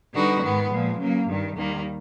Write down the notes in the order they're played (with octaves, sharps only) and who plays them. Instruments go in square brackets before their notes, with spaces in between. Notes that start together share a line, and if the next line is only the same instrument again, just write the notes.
[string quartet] D3 G3 B3 D#4 F#4
G#2 D#3 G#3 B3
A#2 F3 G#3
C#3 F#3 A#3
G2 D#3 G3
D#2 D#3 G3 A#3